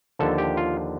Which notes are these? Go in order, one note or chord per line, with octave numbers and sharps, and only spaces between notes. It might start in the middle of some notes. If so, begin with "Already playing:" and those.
D#2 D3 F3 A4
G4
F4